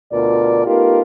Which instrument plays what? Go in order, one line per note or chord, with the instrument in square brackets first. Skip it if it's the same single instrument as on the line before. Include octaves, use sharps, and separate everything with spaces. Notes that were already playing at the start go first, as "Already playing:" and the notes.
[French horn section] D2 B2 F4 A#4 D5
A3 B3 D#4 F4 G4 A#4